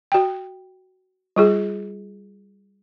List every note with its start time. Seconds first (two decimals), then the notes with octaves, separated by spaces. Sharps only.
0.12 F#4 G5
1.36 G3 F4 G#4